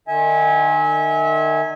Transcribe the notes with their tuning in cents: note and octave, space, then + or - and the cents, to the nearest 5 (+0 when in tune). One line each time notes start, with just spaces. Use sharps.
D#3 -35 E5 -30 G#5 -5